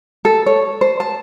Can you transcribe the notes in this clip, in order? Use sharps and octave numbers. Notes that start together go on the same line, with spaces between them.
A4
C#5
C5
A5